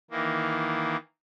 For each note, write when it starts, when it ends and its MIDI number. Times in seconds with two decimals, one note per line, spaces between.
0.11 0.96 51
0.11 0.96 52
0.11 0.96 58